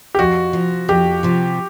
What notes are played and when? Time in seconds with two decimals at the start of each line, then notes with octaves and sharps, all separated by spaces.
0.15 G4
0.19 F2 F#4
0.53 C3 F3
0.89 F2 G4
1.23 C3 F3